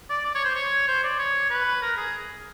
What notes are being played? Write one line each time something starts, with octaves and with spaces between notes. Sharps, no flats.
D5
D5
C#5
C5
C#5
C5
D5
C#5
B4
A#4
G#4